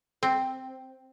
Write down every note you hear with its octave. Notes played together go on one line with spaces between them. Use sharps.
C4